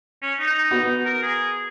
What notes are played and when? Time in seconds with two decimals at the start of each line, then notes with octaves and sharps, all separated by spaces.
0.23 C#4
0.40 D#4
0.71 B3 F#4
1.06 A#4
1.23 G#4